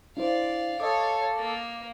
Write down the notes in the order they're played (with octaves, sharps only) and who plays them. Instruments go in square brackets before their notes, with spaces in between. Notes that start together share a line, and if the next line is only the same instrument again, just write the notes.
[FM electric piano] D4 E4 C5 [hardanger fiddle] D5 F5
[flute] A4 [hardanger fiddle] C#5 F5 [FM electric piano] D#5 D6
[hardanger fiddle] A#3